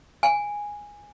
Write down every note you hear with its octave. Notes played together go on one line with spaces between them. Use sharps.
G#5